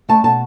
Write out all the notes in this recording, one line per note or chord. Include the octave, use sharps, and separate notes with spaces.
A3 A5
B2 A5